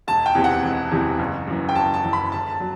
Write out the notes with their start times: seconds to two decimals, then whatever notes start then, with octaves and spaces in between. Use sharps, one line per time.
0.07 E1 A5
0.26 G5
0.35 E2 C3 E3
0.44 F#5
0.63 E1
0.91 E2 C3 E3
1.19 F#1
1.47 F#2 E3
1.69 G5
1.76 F#1 A5
1.94 A5
2.03 F#2 E3
2.13 B5
2.32 G1 A5
2.50 A5
2.60 F#3